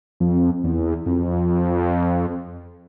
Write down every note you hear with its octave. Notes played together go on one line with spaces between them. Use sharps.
F2
E2
F2